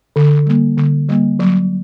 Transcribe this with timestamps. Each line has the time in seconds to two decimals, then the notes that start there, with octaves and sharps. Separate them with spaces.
0.16 D3
0.46 G3 A#3
0.77 D3
1.09 G3 A#3
1.40 F#3